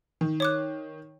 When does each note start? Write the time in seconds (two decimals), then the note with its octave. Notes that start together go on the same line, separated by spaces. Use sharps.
0.21 D#3
0.40 C#5 D6 F#6